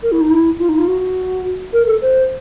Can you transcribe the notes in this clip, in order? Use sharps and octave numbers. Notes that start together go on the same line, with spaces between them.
A#4
E4
D#4
E4
F4
D#4
F4
F#4
A#4
A4
C5